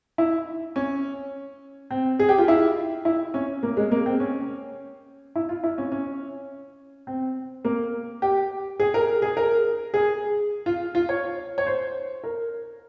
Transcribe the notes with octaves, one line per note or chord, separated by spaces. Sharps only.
E4
C#4
C4
G#4
G4
F4
E4
E4
C#4
A#3
G#3
A#3
C4
C#4
E4
F4
E4
C#4
C#4
C4
A#3
G4
G#4
A#4
G#4
A#4
G#4
F4
F4
C#5
C#5
C5
A#4